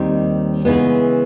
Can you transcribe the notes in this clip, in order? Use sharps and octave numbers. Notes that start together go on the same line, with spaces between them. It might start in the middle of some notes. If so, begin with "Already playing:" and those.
Already playing: D#2 D#3 G3 C4 D#4
C#3 E3 G#3 B3